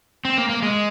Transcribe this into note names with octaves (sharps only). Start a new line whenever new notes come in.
C4
A#3
A#3
G#3